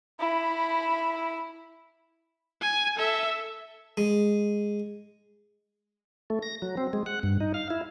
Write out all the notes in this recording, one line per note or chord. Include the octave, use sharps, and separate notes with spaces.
E4 B5
G#5
A4 E5
G#3
A3
A#6
F#3
C4
G#3
F#5
G2
D#4
F5
E4